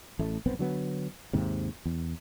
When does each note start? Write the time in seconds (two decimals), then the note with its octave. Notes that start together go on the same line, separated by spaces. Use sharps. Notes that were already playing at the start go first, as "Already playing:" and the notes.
0.19 A1 A3
0.46 F1 B1 B3 C4
0.59 D3 F#3 B3
1.33 D#2 G#2 C3
1.86 E2